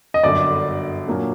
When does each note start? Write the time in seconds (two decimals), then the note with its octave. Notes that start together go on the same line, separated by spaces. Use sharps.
0.14 D#5
0.23 G1 F#2 D3 D5
1.07 A#2 F#3 A#3 D4